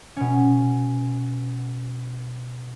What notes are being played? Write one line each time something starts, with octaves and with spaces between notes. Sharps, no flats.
B2 C#4